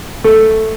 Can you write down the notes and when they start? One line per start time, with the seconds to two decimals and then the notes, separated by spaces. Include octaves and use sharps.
0.24 A3